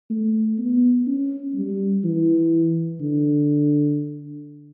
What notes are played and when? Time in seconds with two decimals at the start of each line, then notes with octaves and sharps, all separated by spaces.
0.10 A3
0.58 B3
1.07 C#4
1.55 G3
2.04 E3
3.00 D3